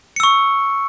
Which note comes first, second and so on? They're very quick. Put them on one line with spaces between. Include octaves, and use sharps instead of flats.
C#7 E6 C#6